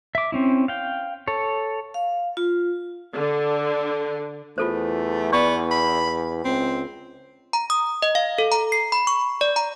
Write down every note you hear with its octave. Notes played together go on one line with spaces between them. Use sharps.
E5 D6
C4 C#4 E4
F5 G5
A4 C#5
F5
F4
D3
E2 A3 F4 A4 C5
B3 D5 C#6
B5
C#2 C4
A#5
D#6
D#5
F5
A4
A#5
C7
B5
C#6
D5
A#5